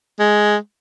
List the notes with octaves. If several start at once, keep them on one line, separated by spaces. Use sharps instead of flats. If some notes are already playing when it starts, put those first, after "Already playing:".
G#3